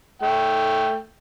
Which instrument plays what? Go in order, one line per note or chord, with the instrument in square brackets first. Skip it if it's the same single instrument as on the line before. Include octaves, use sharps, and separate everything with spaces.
[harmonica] A3 G5